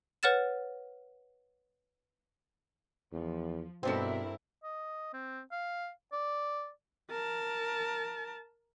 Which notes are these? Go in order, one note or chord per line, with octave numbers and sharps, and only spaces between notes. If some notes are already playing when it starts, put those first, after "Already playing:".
B4 C#5 F#5 F6 A6 E7
E2 F3
G2 B2 C4 D4 E4 A4 A#4
D#5
C4
F5
D5
A#4 A5